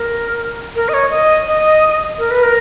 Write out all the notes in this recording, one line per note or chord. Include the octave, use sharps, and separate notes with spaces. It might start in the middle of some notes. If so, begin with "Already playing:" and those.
Already playing: A#4
A#4
D#5
C#5
D#5
D#5
A#4
B4
A#4